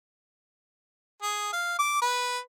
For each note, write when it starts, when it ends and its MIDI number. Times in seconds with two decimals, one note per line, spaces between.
1.22 1.51 68
1.53 1.76 77
1.79 1.97 86
2.02 2.39 71